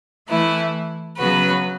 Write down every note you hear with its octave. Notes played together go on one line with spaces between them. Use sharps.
E3 A3 E4 B4
C#3 F#3 B3 F#4 B4